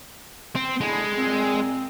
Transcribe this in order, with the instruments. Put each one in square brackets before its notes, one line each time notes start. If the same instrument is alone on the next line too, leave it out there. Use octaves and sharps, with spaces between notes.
[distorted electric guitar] C4
[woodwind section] D3 E4 [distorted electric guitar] G#3
[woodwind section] A#2 C4